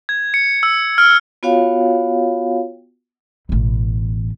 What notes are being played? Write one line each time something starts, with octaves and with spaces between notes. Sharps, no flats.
G#6
C#7
E6
F6
B3 F4 F#4 C#5 F5 G5
A1 B2